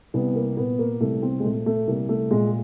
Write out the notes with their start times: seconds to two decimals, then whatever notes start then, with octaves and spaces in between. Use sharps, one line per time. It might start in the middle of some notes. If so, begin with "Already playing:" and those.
0.14 C2 B3
0.35 A#3
0.57 A#2 B3
0.79 A#3
1.01 C2 A3
1.23 C4
1.40 G#3
1.44 A#2 A3
1.66 A3
1.87 C2 A#3
2.09 A3
2.31 A#2 G#3